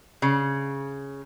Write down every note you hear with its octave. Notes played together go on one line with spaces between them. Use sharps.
C#3